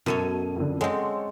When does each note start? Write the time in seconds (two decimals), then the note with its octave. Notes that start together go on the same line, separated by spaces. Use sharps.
0.06 F#2 B2 C#4 A4 C#5 D#7
0.56 F2 D3
0.81 G#3 C4 A4 C#5 F#5